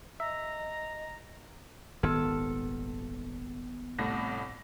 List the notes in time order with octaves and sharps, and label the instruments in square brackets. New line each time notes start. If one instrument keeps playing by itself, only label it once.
[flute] D#5 [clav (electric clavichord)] E5 [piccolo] A#5
[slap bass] D#1 G#1 D#3 [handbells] B3 [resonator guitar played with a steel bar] A4
[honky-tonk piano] C2 A2 A#6